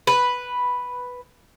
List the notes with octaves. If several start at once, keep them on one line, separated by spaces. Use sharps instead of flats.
B4